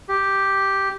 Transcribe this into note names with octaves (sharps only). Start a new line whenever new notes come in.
G4